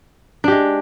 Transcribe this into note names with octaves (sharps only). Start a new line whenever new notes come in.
G#3 D4 G4